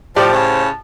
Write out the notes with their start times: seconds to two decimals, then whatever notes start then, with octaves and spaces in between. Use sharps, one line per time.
0.16 A2 F3 G4 C5 D5 A5
0.32 C#3